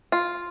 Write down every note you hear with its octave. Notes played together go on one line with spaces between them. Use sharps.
F4